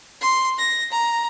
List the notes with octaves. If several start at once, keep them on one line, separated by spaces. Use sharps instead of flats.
C6
A#6
A#5